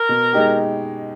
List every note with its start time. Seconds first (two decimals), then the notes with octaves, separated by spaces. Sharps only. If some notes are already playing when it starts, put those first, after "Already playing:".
Already playing: A#4
0.09 B2
0.33 G#3 D#4 G4